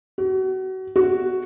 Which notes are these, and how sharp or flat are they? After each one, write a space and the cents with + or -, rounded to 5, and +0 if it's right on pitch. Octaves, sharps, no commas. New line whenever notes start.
F#4 +30
F#4 +0